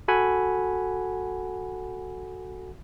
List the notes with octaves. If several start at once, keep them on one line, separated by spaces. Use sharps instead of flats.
F#4 A4 F#5 G#5 B5